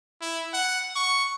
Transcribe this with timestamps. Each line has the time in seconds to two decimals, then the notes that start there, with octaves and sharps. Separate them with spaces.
0.21 E4
0.53 F#5
0.96 C#6